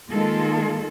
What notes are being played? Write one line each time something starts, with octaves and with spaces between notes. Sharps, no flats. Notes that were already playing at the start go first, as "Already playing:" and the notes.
D#3 G#3 A#3 F4 G#4 A4